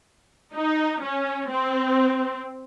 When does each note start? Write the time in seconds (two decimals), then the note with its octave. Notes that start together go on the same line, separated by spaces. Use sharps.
0.54 D#4
1.03 C#4
1.51 C4